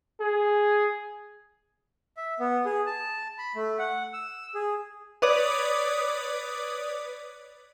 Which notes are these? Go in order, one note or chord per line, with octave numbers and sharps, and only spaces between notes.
G#4
E5
B3
G#4
A5
B5
A3
F#5
E6
G#4
B4 C#5 D5 D6 D#6